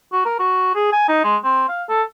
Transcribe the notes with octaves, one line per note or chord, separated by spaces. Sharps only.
F#4
A#4
F#4
G#4
G#5
D#4
G#3
C4
F5
A4